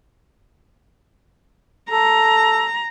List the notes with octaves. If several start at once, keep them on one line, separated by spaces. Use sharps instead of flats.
A4 A#5